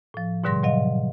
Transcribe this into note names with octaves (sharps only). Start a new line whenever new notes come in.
A2 F3
G#2 B2 D3 G3 C6 A#6
B2 F#3 D#5 F5